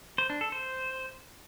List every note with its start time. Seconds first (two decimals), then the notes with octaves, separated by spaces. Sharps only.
0.18 C5
0.30 D4
0.41 A4
0.52 C5